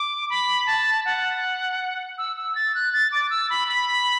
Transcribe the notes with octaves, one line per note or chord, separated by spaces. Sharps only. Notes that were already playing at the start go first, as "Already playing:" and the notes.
Already playing: D6
B5
A5
F#5
E6
E6
A6
F#6
A6
D6
E6
B5
B5